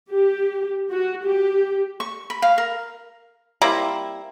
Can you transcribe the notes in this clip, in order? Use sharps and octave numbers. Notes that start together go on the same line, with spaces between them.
G4
F#4
G4
C#6
B5
F5
A#4
G3 A#3 C4 E4